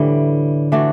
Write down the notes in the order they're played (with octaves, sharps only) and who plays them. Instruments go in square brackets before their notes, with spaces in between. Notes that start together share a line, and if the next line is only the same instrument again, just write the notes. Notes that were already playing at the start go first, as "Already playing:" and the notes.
Already playing: [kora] A2 E3 G3 [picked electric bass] D3
[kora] E3 A3 D4 F#4